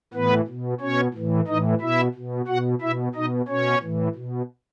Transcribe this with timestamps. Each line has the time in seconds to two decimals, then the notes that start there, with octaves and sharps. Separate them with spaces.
0.14 A2 E3 B3 B4
0.47 B2
0.81 B2 C#4 C#5
1.14 A2 E3
1.47 A2 E3 D#4 D#5
1.81 B2 E4 E5
2.15 B2
2.48 B2 F#4 F#5
2.81 B2 E4 E5
3.15 B2 D#4 D#5
3.48 B2 C#4 C#5
3.81 A2 E3
4.15 B2